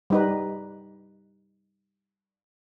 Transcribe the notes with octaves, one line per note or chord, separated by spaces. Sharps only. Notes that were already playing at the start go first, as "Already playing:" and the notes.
G3 D#4 B4